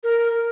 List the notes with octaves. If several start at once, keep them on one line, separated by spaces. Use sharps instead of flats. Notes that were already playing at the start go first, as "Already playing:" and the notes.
A#4